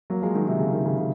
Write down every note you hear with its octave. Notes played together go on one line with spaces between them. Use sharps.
F#3 A#3
F3 G#3
D#3 F#3
C3 D#3
C#3
C3 D#3
C#3
C#3